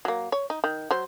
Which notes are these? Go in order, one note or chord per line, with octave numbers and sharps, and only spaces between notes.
F#3 A#3
C#5
D#4
D#3
F#3 C5